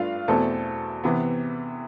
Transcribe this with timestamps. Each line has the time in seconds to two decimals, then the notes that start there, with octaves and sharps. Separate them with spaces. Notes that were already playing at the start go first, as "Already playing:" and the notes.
Already playing: G2 A3 D4 F4 F5
0.28 E2 B2 A3 C4 A4 A5
1.04 C3 E3 B3